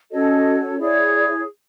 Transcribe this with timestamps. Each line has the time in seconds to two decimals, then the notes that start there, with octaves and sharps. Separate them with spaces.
0.11 C#4 F#4 A4 C#5 D#5
0.78 E4 G#4 C#5 D5